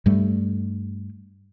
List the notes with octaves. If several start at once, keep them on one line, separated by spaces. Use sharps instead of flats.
G2 G3 A3